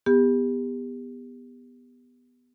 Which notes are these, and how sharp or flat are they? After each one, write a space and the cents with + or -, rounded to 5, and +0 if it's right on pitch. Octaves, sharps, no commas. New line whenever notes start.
B3 +0 G4 +35